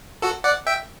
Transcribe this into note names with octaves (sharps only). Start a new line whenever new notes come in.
F#4 A4
D5 F#5
E5 G5